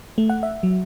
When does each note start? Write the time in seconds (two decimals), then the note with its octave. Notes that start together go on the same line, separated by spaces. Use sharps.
0.18 A3
0.29 F#5
0.43 E5
0.63 F#3